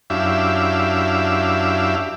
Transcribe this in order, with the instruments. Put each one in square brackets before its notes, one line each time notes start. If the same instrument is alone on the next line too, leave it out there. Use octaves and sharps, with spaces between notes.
[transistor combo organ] F#2 D4 E4 G4 E5 F5